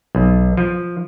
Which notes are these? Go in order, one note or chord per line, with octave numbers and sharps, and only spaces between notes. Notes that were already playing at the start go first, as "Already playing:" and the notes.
B1
F3